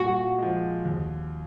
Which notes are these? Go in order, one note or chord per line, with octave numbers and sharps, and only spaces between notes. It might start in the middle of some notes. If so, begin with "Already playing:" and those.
Already playing: A#2 F#4
F3 G#3
D#2